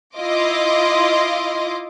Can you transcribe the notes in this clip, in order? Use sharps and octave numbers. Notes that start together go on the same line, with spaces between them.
E4 F4 D#5 F5 C6 D6